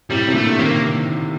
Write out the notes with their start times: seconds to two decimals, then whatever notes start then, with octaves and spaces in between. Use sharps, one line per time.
0.10 A2 C3 G3
0.28 C3
0.34 A#2 D3 A3
0.59 C3 D#3 A#3